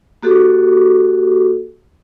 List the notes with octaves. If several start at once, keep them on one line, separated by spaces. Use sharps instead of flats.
A#3 F#4 G4 A4